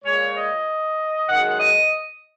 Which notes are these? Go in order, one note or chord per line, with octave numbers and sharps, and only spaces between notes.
A#2 G#3 C#5
D#5
F#2 D#3 G#3 F#5
F#5
D#5